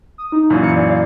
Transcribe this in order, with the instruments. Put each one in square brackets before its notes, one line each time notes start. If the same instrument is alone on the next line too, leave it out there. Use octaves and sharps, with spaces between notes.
[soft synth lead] D#6
D#4
[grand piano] F#2 A#2 E3
[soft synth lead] C#7
D5
F5